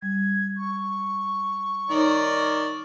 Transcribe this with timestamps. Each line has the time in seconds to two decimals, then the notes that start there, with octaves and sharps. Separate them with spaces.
0.02 G3 G#6
0.57 C#6
1.90 D#3 D#4 C#5 D5